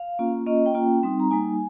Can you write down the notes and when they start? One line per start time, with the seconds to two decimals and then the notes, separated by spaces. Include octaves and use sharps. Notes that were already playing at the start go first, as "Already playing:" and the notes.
Already playing: F5
0.19 A#3 C#4 F4
0.47 A#3 C#4 F4 D#5
0.57 D#5
0.66 G5
0.74 A#3 C#4 F4
1.03 G3 C4 D#4
1.20 A#5
1.31 G3 A#3 D#4 G#5